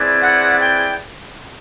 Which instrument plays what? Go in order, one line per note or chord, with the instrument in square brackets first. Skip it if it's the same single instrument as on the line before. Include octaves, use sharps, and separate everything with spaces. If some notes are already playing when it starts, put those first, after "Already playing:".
Already playing: [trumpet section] C4 E4 G#4 B4 D5
[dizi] F#5
G5